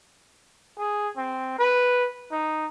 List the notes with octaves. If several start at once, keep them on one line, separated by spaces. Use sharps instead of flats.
G#4
C4
B4
D#4